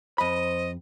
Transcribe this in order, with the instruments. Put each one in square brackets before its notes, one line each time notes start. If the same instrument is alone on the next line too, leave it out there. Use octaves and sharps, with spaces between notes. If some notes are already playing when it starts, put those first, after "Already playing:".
[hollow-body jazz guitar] F2 B5 [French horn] C5 [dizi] D#5